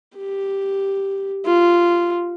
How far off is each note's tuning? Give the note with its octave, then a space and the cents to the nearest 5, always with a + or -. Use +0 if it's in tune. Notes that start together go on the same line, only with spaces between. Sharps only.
G4 +0
F4 -10